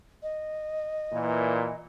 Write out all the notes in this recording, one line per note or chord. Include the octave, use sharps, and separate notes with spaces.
D#5
A#2 E3